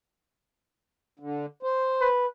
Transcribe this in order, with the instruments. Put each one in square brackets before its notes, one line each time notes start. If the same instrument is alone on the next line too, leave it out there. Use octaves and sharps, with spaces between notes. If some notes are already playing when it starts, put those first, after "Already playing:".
[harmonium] D3
C5
[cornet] B4